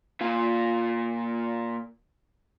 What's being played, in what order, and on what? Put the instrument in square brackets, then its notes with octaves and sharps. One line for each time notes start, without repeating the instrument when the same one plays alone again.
[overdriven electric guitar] A#2 F4